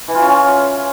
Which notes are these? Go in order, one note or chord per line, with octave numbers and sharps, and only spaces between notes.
E3
F4
C#4